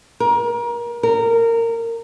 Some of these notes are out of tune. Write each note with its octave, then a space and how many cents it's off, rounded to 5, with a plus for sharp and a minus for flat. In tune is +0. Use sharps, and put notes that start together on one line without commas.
A#4 +30
A#4 -20